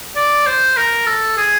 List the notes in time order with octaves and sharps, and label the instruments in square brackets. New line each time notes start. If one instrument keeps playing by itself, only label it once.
[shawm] D5
C5
A#4
A4
G#4